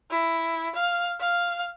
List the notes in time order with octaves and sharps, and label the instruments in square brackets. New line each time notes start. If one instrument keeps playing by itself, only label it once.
[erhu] E4
F5
F5